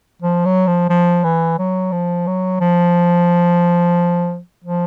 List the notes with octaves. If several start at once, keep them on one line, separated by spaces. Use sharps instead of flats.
F3
F#3
F3
F3
E3
F#3
F3
F#3
F3
F3